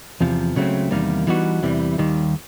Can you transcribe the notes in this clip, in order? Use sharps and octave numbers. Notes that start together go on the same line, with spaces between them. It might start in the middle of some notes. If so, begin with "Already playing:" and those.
E2 C3 F3
C#2 C#3 F#3 A3 C4
E2 C3 D#3 G3 A#3
E3 G3 B3 D#4 F#4
E2 C3 E3 G3
D#2 D#3 G3